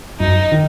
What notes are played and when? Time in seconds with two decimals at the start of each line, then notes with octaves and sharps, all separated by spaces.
0.20 F#2 D#4
0.52 D#3